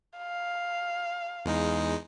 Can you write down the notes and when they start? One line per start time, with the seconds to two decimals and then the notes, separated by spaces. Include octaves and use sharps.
0.18 F5
1.45 E2 G#3 D#4